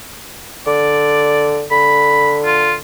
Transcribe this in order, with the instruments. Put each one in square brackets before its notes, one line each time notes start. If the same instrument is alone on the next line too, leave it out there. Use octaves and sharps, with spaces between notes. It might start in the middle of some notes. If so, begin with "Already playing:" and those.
[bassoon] D3 [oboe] D5
[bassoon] D3 [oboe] B5
[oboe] F4